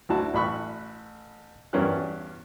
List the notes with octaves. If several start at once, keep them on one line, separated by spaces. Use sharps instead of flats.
D2 D4 E4 F#4 A5
A1 E5 B5 C#6 F#6
E2 G2 C#4 A#4 B4 F#6